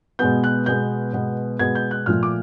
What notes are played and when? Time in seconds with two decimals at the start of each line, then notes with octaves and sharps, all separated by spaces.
0.19 B2 G#3 B3 G6
0.44 F#6
0.66 B2 G#3 B3 G6
1.13 B2 G#3 B3
1.59 B2 G#3 B3 G#6
1.75 G6
1.91 F#6
2.06 A#2 F3 A3 F6
2.23 D6